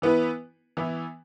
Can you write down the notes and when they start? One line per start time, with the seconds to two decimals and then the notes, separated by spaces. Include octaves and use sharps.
0.02 E3 B3 E4 B4
0.77 E3 B3 E4